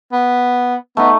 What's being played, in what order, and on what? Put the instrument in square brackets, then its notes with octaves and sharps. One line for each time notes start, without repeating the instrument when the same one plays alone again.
[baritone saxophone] B3
[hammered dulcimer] A3 D#4 [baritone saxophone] B3